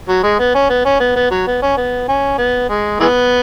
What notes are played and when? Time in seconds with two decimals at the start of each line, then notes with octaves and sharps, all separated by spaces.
0.09 F#3
0.23 G#3
0.39 B3
0.55 C#4
0.70 B3
0.85 C#4
1.00 B3
1.16 B3
1.31 F#3
1.47 B3
1.62 C#4
1.77 B3
2.08 C#4
2.38 B3
2.69 G#3
3.00 E3 G#3 B3